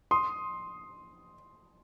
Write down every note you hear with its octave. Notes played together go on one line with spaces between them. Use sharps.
C6 D#6